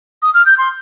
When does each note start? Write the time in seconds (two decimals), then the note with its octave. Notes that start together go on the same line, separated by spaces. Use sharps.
0.22 D#6
0.34 F6
0.46 G6
0.58 C6